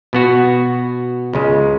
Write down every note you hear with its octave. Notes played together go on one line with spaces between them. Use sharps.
B2 B3 F#4
C#2 C#3 G#3